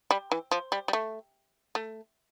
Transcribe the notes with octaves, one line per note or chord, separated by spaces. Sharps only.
G3
E3
F3
G3
G3
A3
A3